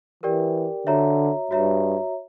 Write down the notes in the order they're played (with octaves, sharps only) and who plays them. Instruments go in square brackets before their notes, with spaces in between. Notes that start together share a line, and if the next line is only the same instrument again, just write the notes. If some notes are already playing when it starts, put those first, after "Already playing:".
[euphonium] E3 [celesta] G4 A#4 D5 G5
[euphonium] D3 [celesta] F#4 C#5 E5 A#5
[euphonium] G2 [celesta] F#4 C#5 E5 A#5